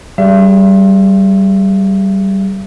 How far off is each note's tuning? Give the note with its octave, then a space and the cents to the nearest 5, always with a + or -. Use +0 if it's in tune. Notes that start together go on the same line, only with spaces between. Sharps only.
G3 -20 G#4 +0 E5 +40